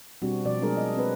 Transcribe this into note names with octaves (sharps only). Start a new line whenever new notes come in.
B2 G3 C4 D4 F#4
B2 F3 D5
F#3 G#3 D4 G#4 A#4
D#5
C4 B4